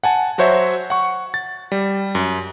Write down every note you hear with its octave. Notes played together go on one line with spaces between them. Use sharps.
F#5 G#5 A5
F#3 F#4 C5 C#5 E5
F#5 C#6
A6
G3
F#2